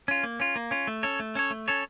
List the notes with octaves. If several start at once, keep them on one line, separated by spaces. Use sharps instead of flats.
C#4 F4
A#3
C#4 F4
A#3
C#4 F4
A3
C#4 A4 C#5
A3
C#4 A4 C#5
A3
C#4 A4 C#5